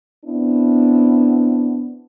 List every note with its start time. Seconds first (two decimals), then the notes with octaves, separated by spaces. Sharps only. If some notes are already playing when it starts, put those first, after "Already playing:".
0.25 B3 C4 D4 E4